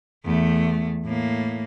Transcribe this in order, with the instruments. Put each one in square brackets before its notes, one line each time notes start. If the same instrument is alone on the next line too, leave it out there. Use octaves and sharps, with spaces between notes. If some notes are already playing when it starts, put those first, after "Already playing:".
[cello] E2 A3
A2 A#3